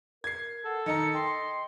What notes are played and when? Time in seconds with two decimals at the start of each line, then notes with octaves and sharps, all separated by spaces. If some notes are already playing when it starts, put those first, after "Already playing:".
0.24 A#4 G#6 C7
0.65 A4 F#5
0.86 D#3 D#4 D#5 A#5 C#7
1.14 G5 C6